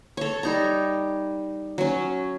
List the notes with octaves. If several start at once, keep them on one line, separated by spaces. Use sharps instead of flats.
A4 C#5
G3 D#4 A#5
F#3 C#4